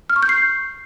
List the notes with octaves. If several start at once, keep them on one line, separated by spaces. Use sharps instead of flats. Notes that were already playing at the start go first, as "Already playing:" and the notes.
F6
C#6
G6
C7